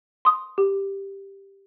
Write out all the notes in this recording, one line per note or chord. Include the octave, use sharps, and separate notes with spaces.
C6 D#6
G4